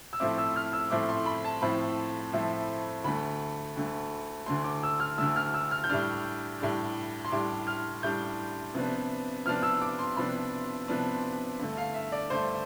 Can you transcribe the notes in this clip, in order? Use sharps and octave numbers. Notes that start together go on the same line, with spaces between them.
E6
A2 F3 A3 C4 E4 D6
E6
F6
E6
A2 F3 A3 C4 E4 D6
C6
B5
A5
A2 F3 A3 C4 E4 B5
A2 F3 A3 C4 E4
D2 D3 A3 B5
D2 D3 A3
D2 D3 A3 C6
D6
E6
F6
D2 D3 A3 E6
F6
E6
F6
G6
A2 G3 D4 F6
A2 G3 D4
C6
A2 G3 D4 D6
F6
A2 G3 D4 G6
C3 F3 B3 D4
C3 F3 B3 D4 F6
E6
D6
C6
C3 F3 B3 D4 B5
C3 F3 B3 D4
G2 D3 A3
F5
E5
D5
G2 D3 A3 C5